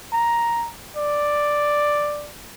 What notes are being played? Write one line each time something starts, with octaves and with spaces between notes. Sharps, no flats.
A#5
D5